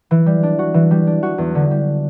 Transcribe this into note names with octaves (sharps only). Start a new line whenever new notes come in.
E3
G3
D4
F#4
E3
G3
D4
F#4
E2
D3
G3